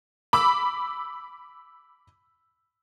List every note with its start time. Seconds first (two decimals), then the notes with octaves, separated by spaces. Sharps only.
0.33 B5 D6 E6